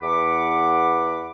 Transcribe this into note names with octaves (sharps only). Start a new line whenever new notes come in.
E2 F#5 B5 D6